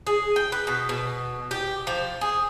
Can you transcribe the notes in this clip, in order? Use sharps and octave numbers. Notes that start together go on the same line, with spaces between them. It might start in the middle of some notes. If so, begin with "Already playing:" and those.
G#4
G5
B4
B2
B2
G4
F3
G#4